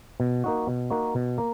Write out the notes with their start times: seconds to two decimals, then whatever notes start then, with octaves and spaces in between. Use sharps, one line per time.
0.20 B2
0.44 A#3 D#4 F#4
0.67 B2
0.90 A#3 D#4 F#4
1.15 B2
1.38 A#3